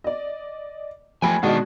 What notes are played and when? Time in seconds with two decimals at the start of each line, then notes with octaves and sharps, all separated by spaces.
0.04 D5 D#5
1.22 F3 A3 G5 G#5 B5 G#6
1.43 B2 D#3 G#3 D4 F#4